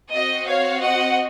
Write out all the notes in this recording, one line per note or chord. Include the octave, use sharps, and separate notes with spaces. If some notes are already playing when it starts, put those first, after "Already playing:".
C4 F#4 D#5
C#5 F5
D#5 F#5